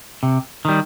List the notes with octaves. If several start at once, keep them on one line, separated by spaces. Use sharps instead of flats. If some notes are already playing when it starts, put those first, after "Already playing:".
C3
D#3 G3